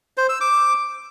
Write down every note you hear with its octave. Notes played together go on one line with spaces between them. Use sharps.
C5
E6
D6